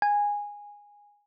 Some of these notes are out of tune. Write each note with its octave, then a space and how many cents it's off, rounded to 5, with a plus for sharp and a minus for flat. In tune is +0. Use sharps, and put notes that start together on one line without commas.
G#5 -15